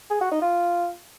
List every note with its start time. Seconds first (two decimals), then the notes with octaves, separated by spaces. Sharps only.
0.10 G#4
0.21 F#4
0.31 D#4
0.42 F4